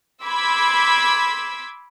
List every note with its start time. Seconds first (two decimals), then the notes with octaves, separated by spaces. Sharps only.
0.24 B5 C6 D6 E6 G#6 B6